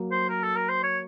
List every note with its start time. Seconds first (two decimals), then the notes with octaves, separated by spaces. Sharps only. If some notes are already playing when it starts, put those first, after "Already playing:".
Already playing: F#3 A#3
0.11 C5
0.29 A#4
0.43 A4
0.56 A#4
0.69 C5
0.83 C#5